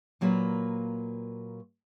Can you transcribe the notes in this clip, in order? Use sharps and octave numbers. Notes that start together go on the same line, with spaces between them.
A#2 F#3 A#3 F4 B4